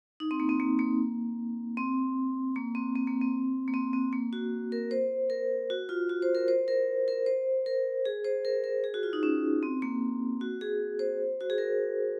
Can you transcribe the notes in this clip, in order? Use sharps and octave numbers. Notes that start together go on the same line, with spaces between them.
D#4
C4
A#3
C4
A#3
A#3
C4
A#3
C4
C4
A#3
C4
A#3
C4
C4
A#3
F#4
A#4
C5
A#4
F#4
F4
F#4
C5
A#4
C5
A#4
A#4
C5
A#4
G#4
C5
A#4
A#4
G#4
F#4
F4
D#4
C#4
C4
A#3
F#4
G#4
C5
F#4
G#4
A#4